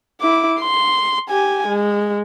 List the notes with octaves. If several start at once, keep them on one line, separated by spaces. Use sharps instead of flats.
E4 D6
C6
G4 G#5
G#3